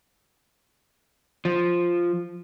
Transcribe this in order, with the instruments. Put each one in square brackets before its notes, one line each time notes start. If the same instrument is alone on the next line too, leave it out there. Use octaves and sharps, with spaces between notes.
[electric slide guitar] F3